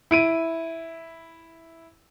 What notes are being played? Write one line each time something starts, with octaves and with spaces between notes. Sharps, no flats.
E4 D7 D#7